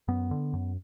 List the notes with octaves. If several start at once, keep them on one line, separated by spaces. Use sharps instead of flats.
F#2 B3
D3
F#2